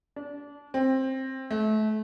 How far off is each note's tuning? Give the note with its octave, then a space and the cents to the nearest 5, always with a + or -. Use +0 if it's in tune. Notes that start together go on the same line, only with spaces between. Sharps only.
D4 -25
C4 +15
A3 -30